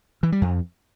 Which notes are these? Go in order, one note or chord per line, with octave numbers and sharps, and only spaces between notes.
E3
G3
F2